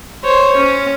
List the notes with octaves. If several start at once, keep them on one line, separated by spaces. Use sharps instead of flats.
C5 C#5
C#4